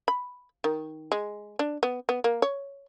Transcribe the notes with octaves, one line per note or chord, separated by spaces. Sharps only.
B5
D#3
G#3
D4
B3
B3
A#3
C#5